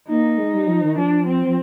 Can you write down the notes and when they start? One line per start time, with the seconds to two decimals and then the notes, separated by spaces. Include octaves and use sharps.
0.09 A#3 D#4
0.38 G#3
0.54 G3
0.67 F3
0.83 D#3
0.97 F3 D4
1.27 C4
1.46 F3